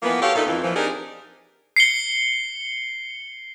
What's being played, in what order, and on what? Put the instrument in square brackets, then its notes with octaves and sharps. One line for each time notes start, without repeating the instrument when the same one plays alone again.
[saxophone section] E3 F3 A#3 B3
F#4 G4 A4 C#5 F5
A#2 A3 D#4
F2 E3
A#2 E3 F3
C4 D4 D#4 G4 G#4 A#4
[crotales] C7 C#7 G7